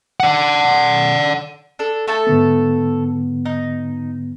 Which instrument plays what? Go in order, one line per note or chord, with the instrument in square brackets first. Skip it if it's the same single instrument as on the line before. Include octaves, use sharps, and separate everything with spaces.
[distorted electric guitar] D5 F#5
[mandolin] D4 A4
A3 A4 A5
[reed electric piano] G#2 D3 B3
[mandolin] D#4